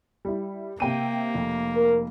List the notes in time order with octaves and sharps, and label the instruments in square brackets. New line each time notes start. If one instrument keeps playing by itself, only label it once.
[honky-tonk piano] G3 E4
[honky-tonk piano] C3 G5 D#7 [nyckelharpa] A#3
[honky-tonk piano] F1
[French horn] A#4